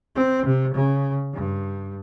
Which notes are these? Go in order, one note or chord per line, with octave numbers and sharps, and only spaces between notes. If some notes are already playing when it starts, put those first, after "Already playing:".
C4
C3
C#3
G2